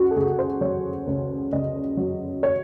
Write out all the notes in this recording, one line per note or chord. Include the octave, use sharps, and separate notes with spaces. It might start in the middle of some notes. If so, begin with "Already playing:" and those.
Already playing: C#2 F#4
A4
C#2 G#4
C5
F#3 C#5
C#2
C#2 D#5
F#3
C#5